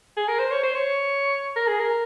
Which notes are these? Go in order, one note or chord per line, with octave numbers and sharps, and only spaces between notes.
G#4
A#4
C5
C#5
C5
C#5
A#4
G#4
A#4